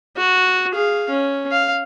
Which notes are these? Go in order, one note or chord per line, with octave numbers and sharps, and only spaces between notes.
F#4
G#4 F5
C#4
F5